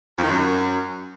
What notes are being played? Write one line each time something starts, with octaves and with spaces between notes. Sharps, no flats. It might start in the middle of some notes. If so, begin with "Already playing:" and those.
F2
D#3
F#2